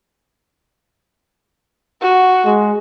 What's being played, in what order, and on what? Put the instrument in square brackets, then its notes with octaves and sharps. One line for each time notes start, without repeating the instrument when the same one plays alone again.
[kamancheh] F#4
[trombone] G#3